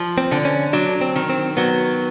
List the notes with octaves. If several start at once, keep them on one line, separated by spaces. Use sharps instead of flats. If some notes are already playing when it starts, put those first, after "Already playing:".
Already playing: F3
C4
D3
C#4
F#3 D4
C4
D#3
C4
F#3 B3